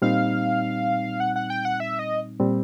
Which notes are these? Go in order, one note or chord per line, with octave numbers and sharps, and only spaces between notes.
A#2 G3 C4 D#4 F5
F#5
F#5
G5
F#5
E5
D#5
A#2 G3 C4